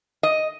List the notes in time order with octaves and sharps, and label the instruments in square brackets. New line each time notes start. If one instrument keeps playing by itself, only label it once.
[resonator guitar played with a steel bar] D#5